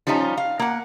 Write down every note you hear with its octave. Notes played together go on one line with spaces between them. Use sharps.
F3 G3 C#4 D#4 F4
F5
A#3 F#5